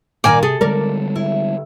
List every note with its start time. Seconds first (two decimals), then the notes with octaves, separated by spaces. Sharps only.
0.24 A#2 D#3 A#3 D5 G#5 A#5
0.43 C3 G#4 A4
0.61 D3 G3 G#3 A#4 D5
1.16 E4